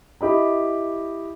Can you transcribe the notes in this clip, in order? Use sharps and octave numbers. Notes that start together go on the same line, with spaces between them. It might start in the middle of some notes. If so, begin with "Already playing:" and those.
E4 G4 D#5 B5